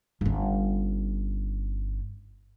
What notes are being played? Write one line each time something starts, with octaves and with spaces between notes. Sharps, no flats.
G1 C#4